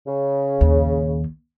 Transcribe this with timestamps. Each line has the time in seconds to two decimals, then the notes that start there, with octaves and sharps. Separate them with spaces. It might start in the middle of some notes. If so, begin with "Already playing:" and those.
0.07 C#3
0.60 A#1 D#2